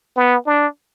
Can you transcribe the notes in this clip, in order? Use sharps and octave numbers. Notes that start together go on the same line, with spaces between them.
B3
D4